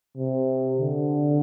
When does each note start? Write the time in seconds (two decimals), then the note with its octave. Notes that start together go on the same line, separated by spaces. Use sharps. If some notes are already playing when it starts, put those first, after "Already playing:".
0.17 C3
0.80 D3